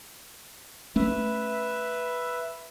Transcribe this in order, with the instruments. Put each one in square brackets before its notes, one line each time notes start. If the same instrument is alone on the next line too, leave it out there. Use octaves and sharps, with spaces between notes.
[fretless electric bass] A3 C#4 [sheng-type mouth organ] B4 E5